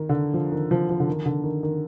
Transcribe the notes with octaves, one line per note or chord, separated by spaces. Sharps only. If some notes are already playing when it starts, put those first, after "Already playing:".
Already playing: D#3
D3
F3
D#3
F3
F3
D3
D#3
D3
D#3
D#3